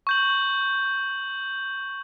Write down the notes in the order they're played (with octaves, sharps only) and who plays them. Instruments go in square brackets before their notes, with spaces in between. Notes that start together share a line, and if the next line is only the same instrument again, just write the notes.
[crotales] C#6 G6 F#7